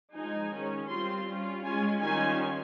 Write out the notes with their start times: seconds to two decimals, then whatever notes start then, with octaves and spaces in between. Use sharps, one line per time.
0.13 F3 G#3 D#4 G#5
0.51 D#3 G#3 C#4
0.88 G3 C4 F4 C6
1.26 G3 C#4 F4
1.63 G#3 C#4 F4 G#5
2.00 D#3 G3 C#4 F4 G#5